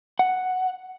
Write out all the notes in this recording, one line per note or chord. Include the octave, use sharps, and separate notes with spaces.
F#5